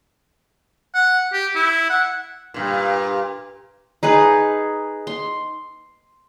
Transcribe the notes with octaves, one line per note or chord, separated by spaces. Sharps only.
F#5
G4
E4
F#5
G2 A#2
D#4 G#4 B4
C6